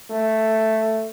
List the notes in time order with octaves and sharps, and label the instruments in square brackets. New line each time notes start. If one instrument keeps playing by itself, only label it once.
[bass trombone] A3